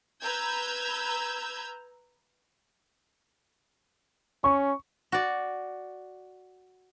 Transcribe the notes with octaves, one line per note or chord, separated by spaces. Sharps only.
B4 A#5 E6 G6 G#6
C#4 C#6
F#4 D5